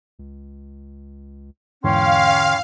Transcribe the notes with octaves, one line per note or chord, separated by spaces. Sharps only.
C#2
E2 G#2 D3 E3 C#4 F5 G5 C6